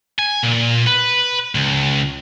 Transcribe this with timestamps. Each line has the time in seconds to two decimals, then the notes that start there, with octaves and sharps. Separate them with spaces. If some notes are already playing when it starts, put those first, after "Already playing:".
0.19 G#5
0.44 A#2
0.87 B4
1.55 C#2